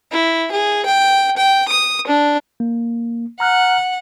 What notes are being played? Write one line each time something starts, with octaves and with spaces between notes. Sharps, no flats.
E4
G#4
G5
G5
D#6
D4
A#3
F#5 A#5 F6 F#6